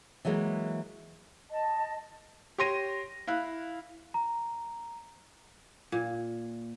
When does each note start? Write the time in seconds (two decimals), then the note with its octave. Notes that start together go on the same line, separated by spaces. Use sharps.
0.25 E3 F#3 G#3 A#3
1.50 D#5 A5
2.58 G4 C#5 C6 A#6 D#7
3.27 E4 F5 F#6
4.14 A#5
5.92 A#2